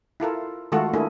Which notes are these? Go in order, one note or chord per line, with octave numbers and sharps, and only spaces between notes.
E4 F4 A4 A#4
D#3 G#3 A3 F4 F#4 A4
A3 A#3 D4 E4 G#4